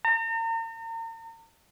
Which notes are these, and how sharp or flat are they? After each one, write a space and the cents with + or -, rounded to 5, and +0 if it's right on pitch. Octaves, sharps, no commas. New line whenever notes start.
A#5 -40